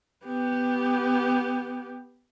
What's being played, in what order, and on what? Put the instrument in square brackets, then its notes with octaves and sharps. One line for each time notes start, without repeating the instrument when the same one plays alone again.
[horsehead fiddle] B3 G4